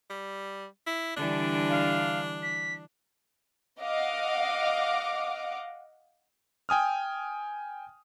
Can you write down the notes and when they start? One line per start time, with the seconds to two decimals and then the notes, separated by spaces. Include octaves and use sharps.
0.10 G3
0.87 E4
1.17 D3 E3 G3 D4
1.70 F5
2.43 B6
3.81 D#5 F5 F#5 D6
6.69 G5 G#5 D#6 F6